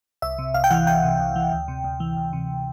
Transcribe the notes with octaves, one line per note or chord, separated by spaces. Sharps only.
C2 E5
C3
C2 F5
G5
E3 F#5
C2 G5
C3
C2
E3
D2
C3
D2
E3
D2
C3